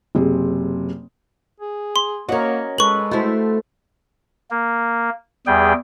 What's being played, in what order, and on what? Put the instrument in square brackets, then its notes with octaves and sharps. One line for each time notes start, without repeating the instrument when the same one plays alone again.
[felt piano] F#1 C3 G#4
[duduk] G#4
[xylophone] C6
[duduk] A#3 [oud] C#4 F#4 [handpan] A#4 C#5 D#5
[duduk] G#3 [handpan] A4 B4 [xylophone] C#6 F#7
[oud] A3 E4 [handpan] F#4 A4 C5
[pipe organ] A#3
E2 G3 G#4 G5